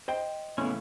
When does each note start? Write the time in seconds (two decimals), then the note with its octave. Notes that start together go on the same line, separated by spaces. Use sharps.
0.08 C5 D#5 G5
0.58 A2 C#3 E3 A3 B3 C#4